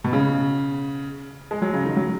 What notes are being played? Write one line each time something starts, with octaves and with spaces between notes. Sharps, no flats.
B2
C#3
G#3
F#3
C#3
D#3
F#3